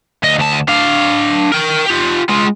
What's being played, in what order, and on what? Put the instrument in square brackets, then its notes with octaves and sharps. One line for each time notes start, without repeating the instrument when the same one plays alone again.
[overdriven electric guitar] D2 D#5
D2 A5
D4 F5
A#4 G5
F4 G4
G#3 F4